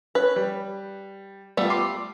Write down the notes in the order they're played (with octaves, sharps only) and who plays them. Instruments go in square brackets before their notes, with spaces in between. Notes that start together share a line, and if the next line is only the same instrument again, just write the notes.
[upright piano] C#4 [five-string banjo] B4
[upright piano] G3
[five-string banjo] G3 A3 [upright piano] B3 F4
[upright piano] C6 D6 C7